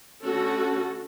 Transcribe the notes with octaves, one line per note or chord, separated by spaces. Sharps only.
D3 A3 C#4 F#4 A4